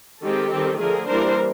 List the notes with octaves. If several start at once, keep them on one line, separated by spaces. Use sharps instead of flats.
D#3 G#3 C4 G4 A4
D#3 G3 C4
D3 F3 A3 G#4 A#4
E3 G3 A#3 D4 A#4 C5